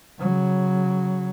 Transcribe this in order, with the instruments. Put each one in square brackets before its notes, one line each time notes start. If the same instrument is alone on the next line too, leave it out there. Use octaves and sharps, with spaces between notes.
[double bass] C#3 F#3